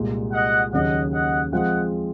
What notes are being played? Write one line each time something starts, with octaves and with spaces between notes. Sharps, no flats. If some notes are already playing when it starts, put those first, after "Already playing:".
Already playing: C2 A#2 G#3
D#5 F#5
D#2 C#3 F#3 D#5 F#5
D#5 F#5
F3 G#3 C4 F4 G#4 D#5 F#5